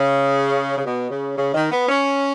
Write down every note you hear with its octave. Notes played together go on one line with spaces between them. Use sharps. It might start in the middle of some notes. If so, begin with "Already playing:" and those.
Already playing: C#3
C#3
B2
C#3
C#3
D#3
B3
C#4